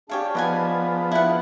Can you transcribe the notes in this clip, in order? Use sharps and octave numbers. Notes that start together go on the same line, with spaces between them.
D4 G4 G#4 C#5 F5 A5
F3 B3 D#4 F#5 G#5
E4 F#5